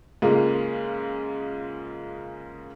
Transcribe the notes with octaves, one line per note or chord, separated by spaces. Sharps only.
G#2 C#3 G#3 A#3 F4